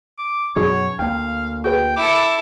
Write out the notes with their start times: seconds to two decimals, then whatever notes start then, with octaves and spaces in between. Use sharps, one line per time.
0.18 D6
0.56 F#2 B2 F#3 D#4 F#4 G#4 C#5
0.99 D2 A#3 F5 G5
1.64 F#4 G#4 B4 G5
1.96 E4 A4 D6